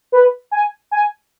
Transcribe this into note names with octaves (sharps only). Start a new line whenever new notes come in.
B4
G#5
G#5